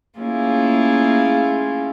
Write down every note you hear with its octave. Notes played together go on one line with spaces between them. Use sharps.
A3 A#3 C#4 E4 F4 G#4